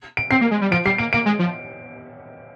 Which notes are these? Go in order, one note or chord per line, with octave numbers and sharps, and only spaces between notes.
D7
C4 C7
A#3
G#3
G3
F3 D7
G3 C7
A#3 D7
A#3 D7
G#3
F3